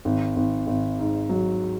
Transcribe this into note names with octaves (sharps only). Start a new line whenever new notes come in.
G#1
G#1
G#1
G#2
F#3